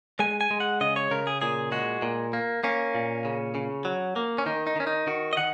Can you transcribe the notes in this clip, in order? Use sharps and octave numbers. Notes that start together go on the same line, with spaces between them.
G#3 G#5
G#5
G#3
F#5
C#3 D#5
C#5
C#3 A#4
G#4
A#2 G#4
G#3 F#4
A#2
A#3
A#3 C#4
A#2
C#3
C#3
F#3
A#3
C#4
D#3 D#4
D#4
D#3 C#4
D#4
D#3 F#4
D#5
D#3 F#5